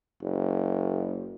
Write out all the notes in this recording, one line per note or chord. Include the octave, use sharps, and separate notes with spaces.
F#1